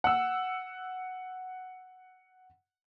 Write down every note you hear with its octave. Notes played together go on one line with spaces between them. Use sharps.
F#5 E6